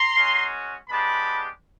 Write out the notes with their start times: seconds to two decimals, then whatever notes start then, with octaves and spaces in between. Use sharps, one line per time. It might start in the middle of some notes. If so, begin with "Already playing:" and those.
Already playing: A#5 C6
0.16 G#3 C#4 F#4
0.89 G#3 B3 D4 G4 A5 B5